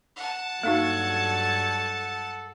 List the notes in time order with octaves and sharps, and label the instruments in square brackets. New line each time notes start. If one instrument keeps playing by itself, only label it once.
[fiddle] F#5 A5
[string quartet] G2 F#3 G#6 [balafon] A#3 D#4 F#4 [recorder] A4